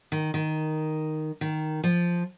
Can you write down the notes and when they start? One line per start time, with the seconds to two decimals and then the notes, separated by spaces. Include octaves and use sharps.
0.12 D#3
0.34 D#3
1.41 D#3
1.84 F3